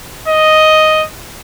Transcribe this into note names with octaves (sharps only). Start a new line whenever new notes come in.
D#5